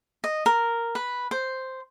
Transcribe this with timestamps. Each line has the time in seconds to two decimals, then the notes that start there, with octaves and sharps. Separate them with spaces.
0.24 D#5
0.46 A#4
0.95 B4
1.31 C5